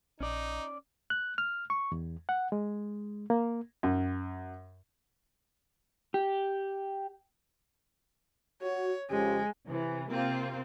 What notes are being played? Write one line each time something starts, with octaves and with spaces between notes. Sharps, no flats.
A#1 C#4 D#4 D5
F#6
F6
C#6
E2
F#5
G#3
A#3
F#2
G4
F#4 C#5
F2 C#3 G#3 G4
C3 E3
C3 A#3 C4 F4